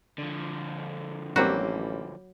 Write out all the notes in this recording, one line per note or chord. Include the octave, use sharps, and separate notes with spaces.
D3 F3
A1 F#3 G3 A#3 C4 F#4